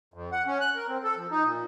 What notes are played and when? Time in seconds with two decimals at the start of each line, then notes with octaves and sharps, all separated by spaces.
0.14 F2
0.32 F#5
0.46 C#4
0.61 F#6
0.75 A#4
0.88 C4
1.04 A4
1.17 F3
1.31 D#4
1.44 A#2